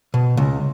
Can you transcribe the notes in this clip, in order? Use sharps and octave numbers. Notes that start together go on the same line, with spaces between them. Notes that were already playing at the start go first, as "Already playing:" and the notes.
B2
C#2